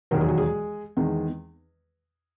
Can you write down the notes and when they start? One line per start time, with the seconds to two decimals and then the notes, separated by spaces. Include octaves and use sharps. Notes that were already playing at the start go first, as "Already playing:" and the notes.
0.11 E1 D#2 D#3 F#3 A#4
0.21 G#4
0.29 F#4
0.37 G#3 G#4
0.97 E2 D#3 G#3